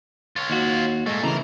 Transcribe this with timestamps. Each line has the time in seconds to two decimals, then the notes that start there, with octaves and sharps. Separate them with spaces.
0.36 F4 C#5
0.50 D#2 F#4
1.06 A#2 G#3 A3
1.23 C#3 E3 A3 A#4 A#5